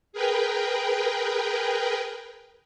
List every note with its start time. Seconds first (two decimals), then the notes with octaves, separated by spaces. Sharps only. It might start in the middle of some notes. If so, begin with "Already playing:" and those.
0.13 G#4 A#4 B4 G5